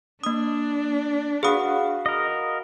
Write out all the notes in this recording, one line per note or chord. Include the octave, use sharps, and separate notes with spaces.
A#3 D4 D#6
F#4 G#4 B4 F5 D#6
A#4 D#5